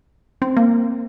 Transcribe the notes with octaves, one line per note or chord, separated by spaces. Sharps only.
C4
A#3